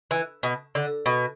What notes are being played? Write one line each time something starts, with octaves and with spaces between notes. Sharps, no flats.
E3
B2
D3
B2